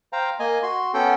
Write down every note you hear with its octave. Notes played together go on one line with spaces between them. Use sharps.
C5 F5 G5 A#5
A#3 D#5 G#5
F#4 C6
B3 C#4 A4 G5